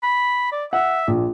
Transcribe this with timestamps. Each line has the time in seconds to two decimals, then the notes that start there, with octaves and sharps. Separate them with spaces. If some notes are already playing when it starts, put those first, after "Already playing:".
0.03 B5
0.52 D5
0.73 E5 F#5
1.08 A#1